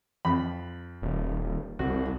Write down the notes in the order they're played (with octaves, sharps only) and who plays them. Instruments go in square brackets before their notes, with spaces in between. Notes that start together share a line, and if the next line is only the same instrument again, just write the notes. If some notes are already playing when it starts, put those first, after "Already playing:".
[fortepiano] F2 B5
[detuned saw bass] D#1
[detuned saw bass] C2 [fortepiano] F#4